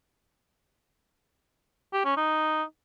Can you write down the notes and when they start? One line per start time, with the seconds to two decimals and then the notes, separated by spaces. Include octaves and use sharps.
1.93 G4
2.05 C#4
2.17 D#4